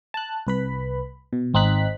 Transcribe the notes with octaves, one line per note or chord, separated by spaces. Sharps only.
A5 F#6
C2 B4 B5
B2
G#1 C4 D#4 F#6 B6